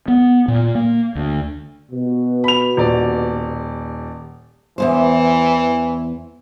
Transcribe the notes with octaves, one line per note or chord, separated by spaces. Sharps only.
B3
A#2
A#3
D2
B2
B5 F7
D#1 D5
E2 A#2 E3 C5